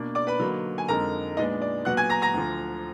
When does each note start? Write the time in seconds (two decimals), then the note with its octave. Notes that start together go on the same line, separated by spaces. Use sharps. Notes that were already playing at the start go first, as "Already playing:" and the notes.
Already playing: B2 A#3 D4
0.15 D5 D6
0.27 B4 B5
0.40 D3 F#3 A#3 D#4
0.78 G#5
0.88 F2 D3 G#3 D#4 A#4 A#5
1.37 A#2 G#3 B3 D4 D#4 D#5
1.62 D5
1.85 A#2 F#3 B3 F#5 F#6
1.97 G#5 G#6
2.10 A#5 A#6
2.22 A#5 A#6
2.34 D2 D3 F3